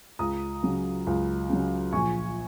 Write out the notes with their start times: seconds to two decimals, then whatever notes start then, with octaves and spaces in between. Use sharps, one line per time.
0.19 C#2 A#5 D#6
0.63 C#3 F#3
1.07 C#2
1.49 C#3 F#3
1.93 A#1 G#5 C#6